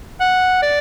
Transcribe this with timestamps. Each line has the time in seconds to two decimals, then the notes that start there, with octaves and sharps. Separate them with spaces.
0.20 F#5
0.62 D5